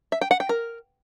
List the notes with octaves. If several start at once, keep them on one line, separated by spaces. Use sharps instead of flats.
E5
G5
F#5
G5
A#4